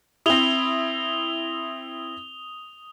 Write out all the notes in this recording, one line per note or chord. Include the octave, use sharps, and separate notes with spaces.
C4 E4 D#6 F7 G7